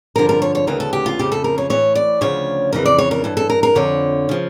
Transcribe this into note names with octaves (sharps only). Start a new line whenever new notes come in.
G2 D3 F3 A#4
A#4
C#5
C#5
D2 C#3 E3 A#4
A4
G4
F4
F2 C#3 F3 G4
A4
A#4
C#5
A2 E3 C#5
D5
D2 C#3 F3 C#5
F2 C#3 E3 A#4
D5
C#5
A#4
G2 E3 A4
A4
A#4
A#4
F2 D3 F3 C#5
C#3 F3